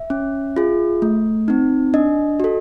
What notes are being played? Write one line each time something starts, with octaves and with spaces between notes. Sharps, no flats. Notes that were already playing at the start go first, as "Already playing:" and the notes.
Already playing: E5
C#4
F4 G#4
A3
C4 D#4
D4 D#5
F#4 A4